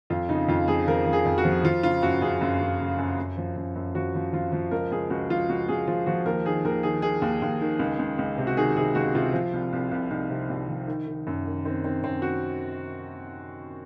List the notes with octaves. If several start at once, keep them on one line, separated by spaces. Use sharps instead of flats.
F2 F4
C#3 D#4
F2 F4
F3 G#4
F3 A#4
F3
G#4
F2
F#4
F3
F3 F4
C#3 F4
F#2 F#4
F#2 G#4
F#2
F#2
C#3
F#2
F#2
F3
F#2
F#2
F3 F#4
F3
F3 F4
F3
C#2 A#4
C#2 G#4
C#2 F#4
F3 F4
C#2 F#4
C#2 G#4
F3 F4
F3 F#4
D#2 A#4
D#3 G#4
D#2 A#4
D#3 G#4
D#3 G#4
D#2
D#2
D#3
C#2
C#2
C#2
C3
F#4
D#3 G#4
C3 G#4
C#2 F#4
C3 F4
F3
C2
C2
C2
C2 D#4
C3
C2
F3
D#3
D#3
F#2
D#3
D#3 C4
D#3 C4
F#2 C4
F#4